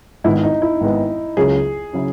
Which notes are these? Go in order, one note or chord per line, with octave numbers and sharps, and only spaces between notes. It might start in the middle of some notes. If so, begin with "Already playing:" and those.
G#1 G#2 D#3 G#3 B3 E4
D#4
E4
G#1 G#2 D#3 G#3 B3
C#2 C#3 F#3 C#4 E4 G#4
C#3 F#3 C#4 E4